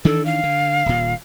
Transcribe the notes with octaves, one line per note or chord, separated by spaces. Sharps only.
D#3 E3 D4 A4
F5
D3
D#1 A#2